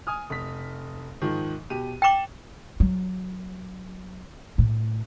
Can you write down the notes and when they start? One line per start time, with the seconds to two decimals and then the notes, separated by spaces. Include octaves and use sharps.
0.07 G#5 D#6 F6
0.30 F1 B6
1.21 G#2 D#3 F3
1.70 B2 G4 D#7
2.02 G5 D6 A6 E7 F#7
2.80 F#3
4.58 A2